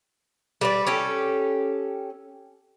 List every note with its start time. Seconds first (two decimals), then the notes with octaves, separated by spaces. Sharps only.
0.61 G3 B4 D5
0.87 C#4 G4 A4